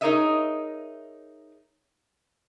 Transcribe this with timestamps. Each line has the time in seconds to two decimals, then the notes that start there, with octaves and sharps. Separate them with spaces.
0.01 D#4 G#4 A#4 C#5 D#5 E5